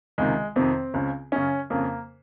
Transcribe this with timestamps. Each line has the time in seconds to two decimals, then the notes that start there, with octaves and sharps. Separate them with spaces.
0.18 C#2 C3 D#3 G#3
0.56 F2 C3 D#3 C4
0.94 C#2 C#3
1.32 F#2 C#3 C#4
1.70 F2 C#3 A#3